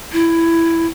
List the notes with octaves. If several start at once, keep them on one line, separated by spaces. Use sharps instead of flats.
E4